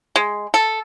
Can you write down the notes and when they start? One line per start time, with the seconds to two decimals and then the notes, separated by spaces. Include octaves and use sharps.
0.16 G#3
0.54 A4